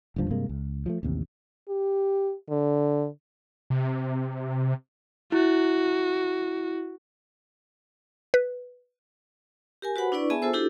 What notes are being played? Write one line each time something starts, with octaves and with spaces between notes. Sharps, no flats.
F#1 D2 G2 F3
G2 C3 G#3 A#3
C#2
F3 F#3 A3
A1 D#2 C3
G4
D3
C3
E4 F#4
B4
G4 A#4 G#5
F#4 B4 C5 F#5 B5
D4 E4 B4 D5 C#6
B3 G#4 E5 G#5 A5
F4 A4 C5 E6
D4 E4 F#4 G4 A4